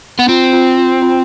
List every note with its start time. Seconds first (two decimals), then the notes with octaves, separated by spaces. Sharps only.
0.19 B3
0.28 C4 F4
0.53 F4
0.78 F4
1.02 F4